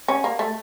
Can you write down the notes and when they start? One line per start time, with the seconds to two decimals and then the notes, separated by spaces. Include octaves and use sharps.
0.08 C#4
0.24 A#3
0.39 A3